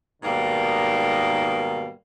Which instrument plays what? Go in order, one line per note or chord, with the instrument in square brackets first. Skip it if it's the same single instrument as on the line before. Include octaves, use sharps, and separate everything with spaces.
[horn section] G#2 B2 D#3 G3 A#3